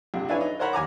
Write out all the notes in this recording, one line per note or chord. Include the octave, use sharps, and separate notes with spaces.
A#1 C3
D4 E4 B4 C#5 F5 G#5
D#4
A#4 C5 C#5 F#5 A#5 B5
D#2 G#5 A#5 D6